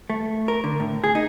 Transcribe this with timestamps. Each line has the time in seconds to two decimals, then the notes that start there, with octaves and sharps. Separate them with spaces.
0.10 A3
0.48 A#4
0.64 D3
0.80 A2
1.04 G#4
1.15 D#4